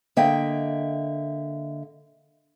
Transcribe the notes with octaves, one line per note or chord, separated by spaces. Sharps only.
D3 A#3 D#5 E5 G5